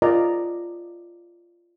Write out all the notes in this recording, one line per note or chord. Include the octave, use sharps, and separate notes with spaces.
F4 A#4 D5 D#5 A#5